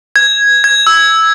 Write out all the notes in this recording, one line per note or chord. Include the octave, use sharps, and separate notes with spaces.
G#6
G#6
E6